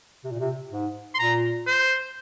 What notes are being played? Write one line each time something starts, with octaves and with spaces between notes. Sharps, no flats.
C3
A#2
C3
G#2
C6
A#2 A#5
C5